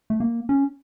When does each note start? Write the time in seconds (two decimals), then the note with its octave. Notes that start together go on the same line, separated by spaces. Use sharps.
0.10 A3
0.20 A#3
0.49 C#4